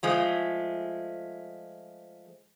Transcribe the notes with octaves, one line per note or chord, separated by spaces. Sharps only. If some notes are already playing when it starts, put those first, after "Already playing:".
F3 G#3 A3